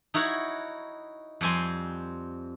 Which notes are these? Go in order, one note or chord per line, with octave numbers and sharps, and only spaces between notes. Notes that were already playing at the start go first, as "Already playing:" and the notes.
D#4 E4 F#4 C#5 F#5
F2 G3 C4 G#5 C6